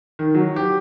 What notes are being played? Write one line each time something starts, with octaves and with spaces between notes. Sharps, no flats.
D#3
F#3
G4